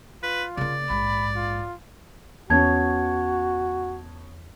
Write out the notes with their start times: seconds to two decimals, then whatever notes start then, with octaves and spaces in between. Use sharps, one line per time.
0.23 F4 B4
0.57 C#3 A#3 D5
0.90 A#1 G#2 B5
1.36 F4
2.50 E2 B3 C#4 F#4 C#5 A5 G#6